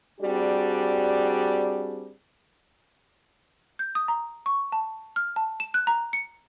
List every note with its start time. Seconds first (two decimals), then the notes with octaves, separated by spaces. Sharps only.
0.20 G3 C4 D4 F#4 G#4
3.79 G6
3.95 D#6
4.08 A#5
4.46 C#6
4.72 A5
5.16 F6
5.36 A5
5.60 E7
5.74 F#6
5.87 A#5
6.13 C#7